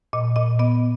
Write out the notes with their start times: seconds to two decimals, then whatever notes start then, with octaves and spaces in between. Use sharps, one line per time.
0.13 A#2 D#5
0.36 A#2 D#5
0.59 B3 D#5